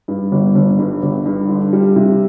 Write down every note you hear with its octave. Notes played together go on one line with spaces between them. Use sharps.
G2
G1
G1
G2
G1
G2
D3
G3
C3